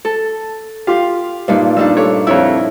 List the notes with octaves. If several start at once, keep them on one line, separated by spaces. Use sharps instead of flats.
A4
F4 G4 F5
G2 A#2 D#4
G3 D4 D#4 E6
A3 C#5 D6
F2 E4 C#5 E6